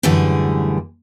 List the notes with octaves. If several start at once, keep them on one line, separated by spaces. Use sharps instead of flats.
F#2 A2 D3 E3 G3 G#4